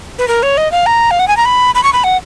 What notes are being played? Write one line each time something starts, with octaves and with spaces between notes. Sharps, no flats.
B4
A#4
C#5
D#5
F5
A#5
F5
F#5
G#5
A#5
B5
B5
C#6
B5
F#5